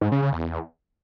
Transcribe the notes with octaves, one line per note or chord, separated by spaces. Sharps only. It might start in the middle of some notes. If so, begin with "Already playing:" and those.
G#2
C#3
C#3
E2